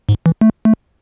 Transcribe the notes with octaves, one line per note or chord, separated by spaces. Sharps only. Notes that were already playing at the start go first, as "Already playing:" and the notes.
G#2
E3
A3
A3